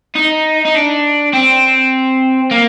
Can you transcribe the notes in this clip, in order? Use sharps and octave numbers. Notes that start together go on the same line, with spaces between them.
D#4
D#4
D4
C4
A#3